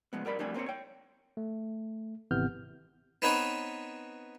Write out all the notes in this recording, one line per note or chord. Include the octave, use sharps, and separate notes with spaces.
F3 G#3 B3
G2 A#4 D5 B5
F2 G3 A3 D4 G5 G#5
A#3 C4 G#4 C5 C#5
C#5 G5
A3
G#1 C3 E3 B3 F6 G6
B3 C4 D#4 B4 C#5